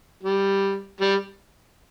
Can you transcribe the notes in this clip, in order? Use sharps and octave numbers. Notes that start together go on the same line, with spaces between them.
G3
G3